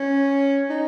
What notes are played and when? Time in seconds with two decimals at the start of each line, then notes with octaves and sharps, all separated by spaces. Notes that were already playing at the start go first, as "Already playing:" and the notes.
Already playing: C#4
0.70 D#4